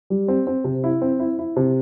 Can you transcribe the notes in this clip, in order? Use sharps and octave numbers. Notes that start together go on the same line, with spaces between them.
G3
C4
C4
C3
E4
C4
E4
E4
C3